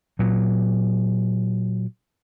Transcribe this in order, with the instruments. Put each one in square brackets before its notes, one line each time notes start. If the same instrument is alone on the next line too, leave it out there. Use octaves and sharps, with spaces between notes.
[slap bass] A#2 F#3